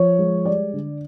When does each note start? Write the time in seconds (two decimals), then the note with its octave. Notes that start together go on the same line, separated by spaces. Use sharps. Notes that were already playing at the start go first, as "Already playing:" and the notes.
Already playing: F3 C#5
0.19 G#3
0.45 G3 D5
0.73 D3